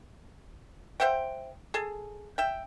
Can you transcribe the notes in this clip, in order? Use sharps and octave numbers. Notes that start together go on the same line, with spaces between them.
C5 E5 F#5 G5
G#4 A4
E5 G5